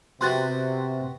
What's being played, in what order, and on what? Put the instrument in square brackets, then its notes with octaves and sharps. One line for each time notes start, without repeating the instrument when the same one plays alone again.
[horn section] C3 [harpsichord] B3 F#4 G4 [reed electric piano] C6 F#6 A6